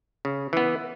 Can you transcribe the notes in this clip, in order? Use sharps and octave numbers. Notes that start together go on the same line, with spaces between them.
C#3
E3 B3